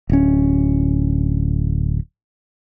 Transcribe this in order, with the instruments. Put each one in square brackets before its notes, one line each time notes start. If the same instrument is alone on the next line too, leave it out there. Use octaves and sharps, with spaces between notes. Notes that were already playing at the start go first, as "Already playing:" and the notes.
[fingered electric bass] D1 C#4